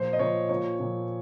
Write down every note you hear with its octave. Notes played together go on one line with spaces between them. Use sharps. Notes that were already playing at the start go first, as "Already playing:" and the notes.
Already playing: A#2 F3 C5
D#5
A#2 F3 C#5
A#2 F3 C#5
A#2 F3